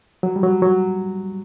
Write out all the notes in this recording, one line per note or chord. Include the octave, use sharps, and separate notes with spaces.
F#3
G3
F#3
F#3